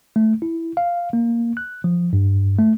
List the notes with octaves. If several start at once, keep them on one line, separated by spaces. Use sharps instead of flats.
A3
E4
F5
A#3
F#6
F3
G2
A3